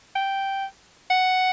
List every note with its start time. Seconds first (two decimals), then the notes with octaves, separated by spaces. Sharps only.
0.16 G5
1.10 F#5